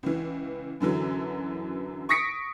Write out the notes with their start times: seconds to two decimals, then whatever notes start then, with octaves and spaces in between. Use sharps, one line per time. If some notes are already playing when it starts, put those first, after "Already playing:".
0.03 C#2 E3
0.80 F#2 D3 E3 F#3
2.09 C#6 D#6 A#6 B6 C#7 D7